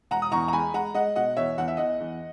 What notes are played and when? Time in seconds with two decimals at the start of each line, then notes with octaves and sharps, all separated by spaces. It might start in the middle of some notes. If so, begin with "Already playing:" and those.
0.11 E1 F#5 A#5
0.22 D#6
0.32 E2 A#5 C#6
0.48 A#5
0.53 G#3 G#5 B5
0.74 G#3 F#5 A#5
0.94 G#3 D#5 F#5
1.16 B2 D#5 F#5
1.36 E2 C#5 E5
1.58 E2 F#5
1.68 E5
1.77 E2 D#5 F#5
2.00 E2